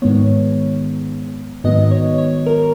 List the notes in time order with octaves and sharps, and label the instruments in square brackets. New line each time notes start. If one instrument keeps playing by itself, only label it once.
[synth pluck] G#2 D#3 G#3 B3 C#5
G#2 D#3 F#3 B3 D#5
C#5
C#5
A#4